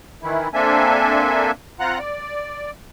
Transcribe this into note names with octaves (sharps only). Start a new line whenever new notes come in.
D#3 E3 E4
A#3 C4 D4 A4 E5 G#5
C4 F4 F#5 A#5 F#6
D5